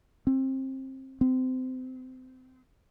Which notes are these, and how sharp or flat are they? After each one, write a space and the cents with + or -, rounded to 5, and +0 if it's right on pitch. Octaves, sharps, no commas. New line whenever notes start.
C4 +25
C4 -30